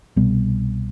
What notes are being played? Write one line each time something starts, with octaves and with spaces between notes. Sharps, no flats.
C2 B2 G3 B3